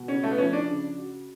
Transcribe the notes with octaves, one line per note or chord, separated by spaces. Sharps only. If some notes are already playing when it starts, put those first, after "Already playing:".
Already playing: B2
C#3 C#4
A3
B3
F3 C#4
D4
C#3
F#4